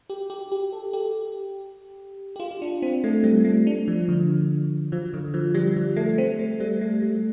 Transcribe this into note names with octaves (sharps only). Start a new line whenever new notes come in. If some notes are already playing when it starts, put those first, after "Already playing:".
G4
G4
G4
A4
G4
G4
F4
F4
D4
C4
A3
G3
A3
D4
F3
D3
F3
D3
F3
G3
F3
A3
C4
A3
G3
A3
G3